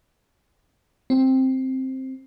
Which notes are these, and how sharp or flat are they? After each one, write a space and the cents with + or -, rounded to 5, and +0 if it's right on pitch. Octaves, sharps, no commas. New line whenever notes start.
C4 +5